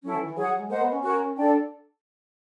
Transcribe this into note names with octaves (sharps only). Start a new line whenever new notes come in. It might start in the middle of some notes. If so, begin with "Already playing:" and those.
F#3 C#4 E4 A4
E3
E3
F#3 G#4 C#5 F#5
F#3
G#3
A#3 C5 D#5 F#5
B3
C#4
F#4 A#4 C#5
D4 A4 D5 G5